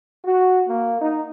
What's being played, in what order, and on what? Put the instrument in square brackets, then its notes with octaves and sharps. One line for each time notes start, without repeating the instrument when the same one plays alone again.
[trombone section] F#4
A#3
D#4